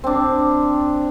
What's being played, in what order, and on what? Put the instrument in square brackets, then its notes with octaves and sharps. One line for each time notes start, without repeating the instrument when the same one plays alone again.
[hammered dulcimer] C4 D4